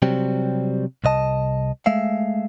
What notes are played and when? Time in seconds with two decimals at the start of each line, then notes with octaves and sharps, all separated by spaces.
0.02 C3 F#3 G3 C4
1.04 C2 C3 D#5 A5
1.86 G#3 A3 E5 F5